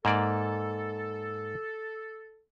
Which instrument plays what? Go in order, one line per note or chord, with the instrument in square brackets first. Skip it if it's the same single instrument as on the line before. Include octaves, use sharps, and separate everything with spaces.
[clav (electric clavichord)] G#2 A#3 D5 [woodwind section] A4